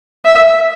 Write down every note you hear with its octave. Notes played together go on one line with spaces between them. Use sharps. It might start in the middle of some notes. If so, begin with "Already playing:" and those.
E5